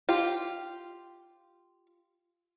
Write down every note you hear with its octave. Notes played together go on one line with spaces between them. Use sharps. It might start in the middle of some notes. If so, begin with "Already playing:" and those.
F4 G4